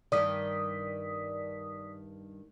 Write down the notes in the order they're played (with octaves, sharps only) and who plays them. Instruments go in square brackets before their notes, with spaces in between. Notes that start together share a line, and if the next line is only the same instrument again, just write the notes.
[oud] G2 D#3 [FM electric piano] D5 D#6 B6